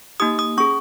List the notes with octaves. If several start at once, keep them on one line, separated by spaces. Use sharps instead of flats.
A#3 D#4 G4 D#6
D#6
C#4 G#4 C#6